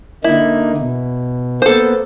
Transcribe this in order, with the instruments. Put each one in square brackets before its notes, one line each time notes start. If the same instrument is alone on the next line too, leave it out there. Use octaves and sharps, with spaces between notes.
[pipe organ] D3 A#3 D#4 [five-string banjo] E4
[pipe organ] B2
[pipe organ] A#3 B3 [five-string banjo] A4 C5